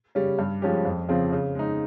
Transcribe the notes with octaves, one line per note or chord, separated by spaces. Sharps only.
C#3 G3 C#4
G2
F3 G#3 C#4 G4
F2
C#3 F3 C4
C#3
G#3 D#4